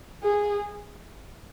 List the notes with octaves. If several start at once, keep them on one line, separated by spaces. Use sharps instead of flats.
G#4